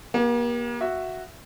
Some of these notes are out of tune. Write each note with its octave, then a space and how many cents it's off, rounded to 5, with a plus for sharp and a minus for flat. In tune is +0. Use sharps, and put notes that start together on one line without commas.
A#3 +40 G4 +0
F#4 +0 E5 +5